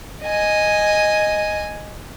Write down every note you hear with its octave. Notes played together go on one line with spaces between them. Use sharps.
D#5 G#5